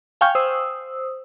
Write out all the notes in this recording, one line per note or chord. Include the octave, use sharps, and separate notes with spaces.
F5 G5 G#5 C#6 F6 G6
C5 D#6 E6